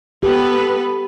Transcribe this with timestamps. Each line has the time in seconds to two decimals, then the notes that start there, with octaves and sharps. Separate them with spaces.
0.23 B3 G4 A4 B4